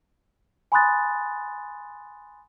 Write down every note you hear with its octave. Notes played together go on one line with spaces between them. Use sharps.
G#5 B5 C6 D#6 F#6 A6